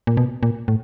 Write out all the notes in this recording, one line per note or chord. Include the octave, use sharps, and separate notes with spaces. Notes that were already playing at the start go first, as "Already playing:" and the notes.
A#2
B2
A#2
A2